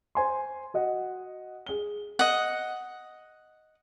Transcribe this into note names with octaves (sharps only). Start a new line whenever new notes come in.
C5 G#5 C6
F#4 D#5 F#5
G#4 G7
D#5 F#5